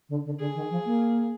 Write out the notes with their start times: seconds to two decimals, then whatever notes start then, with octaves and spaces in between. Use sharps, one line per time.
0.09 D3
0.25 D3
0.39 D3 G#4
0.55 D#3
0.70 F3
0.85 A#3